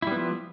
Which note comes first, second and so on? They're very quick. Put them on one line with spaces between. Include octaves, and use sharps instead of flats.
E4 G3 B3 F3